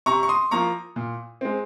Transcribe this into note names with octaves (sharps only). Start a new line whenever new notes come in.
C3 A#5 C#6
C#6
C6 D#6
F3 A#3 A#5 C#6
A#2
G#3 C4